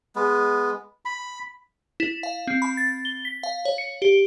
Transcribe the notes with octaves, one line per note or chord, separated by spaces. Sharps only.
G#3 B3
B5
E4
F5
C4
B5
A6
G7
B6
F5
C#5
C#7
G4